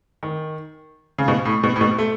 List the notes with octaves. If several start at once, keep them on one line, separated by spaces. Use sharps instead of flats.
D#3
C#3
B2
A2
B2
A2
B2
A3